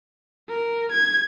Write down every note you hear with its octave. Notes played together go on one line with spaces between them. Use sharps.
A#4
G#6